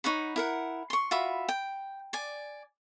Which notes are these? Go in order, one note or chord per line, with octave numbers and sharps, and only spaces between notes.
D#4 C#5 F#5 B5
E4 A#4 F#5
C6 C#6
F4 F#4 E5 B5
G5
D5 G#5